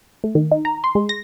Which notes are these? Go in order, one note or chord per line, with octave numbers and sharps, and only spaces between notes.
A3
D#3
D#4
A#5
C6
G#3
A#6